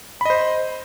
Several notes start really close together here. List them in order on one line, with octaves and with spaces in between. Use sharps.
B5 D#5 C5